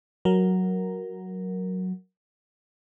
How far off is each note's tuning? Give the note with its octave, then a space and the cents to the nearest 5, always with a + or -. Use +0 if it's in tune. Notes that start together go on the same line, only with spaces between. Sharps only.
F#3 +0 A#4 +0